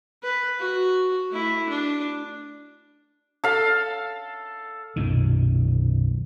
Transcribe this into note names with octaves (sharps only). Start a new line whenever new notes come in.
B4
F#4
A3 E4
D4
A4 F5
B1 F#2 A#2 D#3